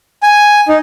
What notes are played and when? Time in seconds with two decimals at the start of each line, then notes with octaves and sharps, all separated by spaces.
0.23 G#5
0.68 D#4